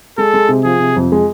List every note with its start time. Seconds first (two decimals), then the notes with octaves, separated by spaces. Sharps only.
0.18 G#3 A4
0.34 G#3
0.49 C3
0.64 F3 G#4
0.80 C3
0.96 F2
1.12 G#3